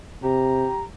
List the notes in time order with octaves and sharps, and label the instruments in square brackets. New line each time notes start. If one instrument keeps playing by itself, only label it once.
[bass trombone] C3 [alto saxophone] G4 [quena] A#5